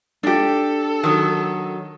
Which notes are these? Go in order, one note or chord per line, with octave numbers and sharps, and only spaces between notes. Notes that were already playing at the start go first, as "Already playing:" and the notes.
D4 G4 A4
D#3 F#3